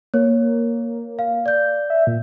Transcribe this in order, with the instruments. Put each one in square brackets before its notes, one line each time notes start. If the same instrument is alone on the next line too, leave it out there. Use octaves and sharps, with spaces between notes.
[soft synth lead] A#3 [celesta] C#5
[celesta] F5
D5 G6
[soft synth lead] E5
A#2